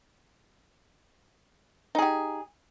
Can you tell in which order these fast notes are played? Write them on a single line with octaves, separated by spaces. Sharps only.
D#4 G#4 G4